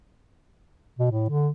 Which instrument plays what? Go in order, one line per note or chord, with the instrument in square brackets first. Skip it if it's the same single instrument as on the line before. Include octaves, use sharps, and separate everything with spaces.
[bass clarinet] B2
A2
D3